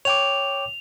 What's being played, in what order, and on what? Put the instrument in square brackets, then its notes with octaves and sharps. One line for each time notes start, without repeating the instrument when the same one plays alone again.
[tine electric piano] C#5 G5 D6 [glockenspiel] F7